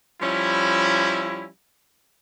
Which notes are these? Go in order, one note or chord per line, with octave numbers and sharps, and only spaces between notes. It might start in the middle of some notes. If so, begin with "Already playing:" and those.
F3 G3 C#4 E4